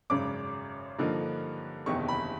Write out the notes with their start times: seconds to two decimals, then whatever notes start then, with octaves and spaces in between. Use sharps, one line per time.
0.10 G#1 F#2 C#3 D6
0.99 G2 D3 F3 A#3 D#4
1.86 F#1 E2 C3 D#3 C#6
2.08 B5